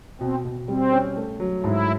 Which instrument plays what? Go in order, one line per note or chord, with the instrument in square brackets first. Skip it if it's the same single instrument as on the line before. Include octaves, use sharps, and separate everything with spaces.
[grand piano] B2 [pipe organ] C4
[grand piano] B2
[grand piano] G3 [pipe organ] C4
[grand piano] C#4
A3
F#3
[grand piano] G#2 [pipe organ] E4